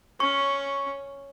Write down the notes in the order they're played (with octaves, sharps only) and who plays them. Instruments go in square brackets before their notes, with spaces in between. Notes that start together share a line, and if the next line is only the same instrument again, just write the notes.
[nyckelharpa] C#4 [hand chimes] C#6